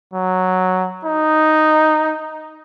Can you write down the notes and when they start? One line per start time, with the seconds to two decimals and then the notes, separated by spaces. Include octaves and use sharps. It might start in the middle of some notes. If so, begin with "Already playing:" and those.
0.13 F#3
1.05 D#4